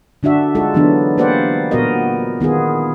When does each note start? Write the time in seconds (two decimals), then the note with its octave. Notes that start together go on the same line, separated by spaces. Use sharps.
0.23 D3 D4 F#4 E5
0.55 G#3 D#4 F4 F#4 A4
0.74 D3 E3 F#3 B3 D4
1.18 A#3 G4 B4 C5 D5 F#5
1.71 A#2 B3 F#4 A#4 D#5
2.40 D#3 B3 F4 G#4